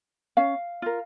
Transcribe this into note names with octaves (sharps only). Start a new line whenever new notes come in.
C#4 F5
F4 A#4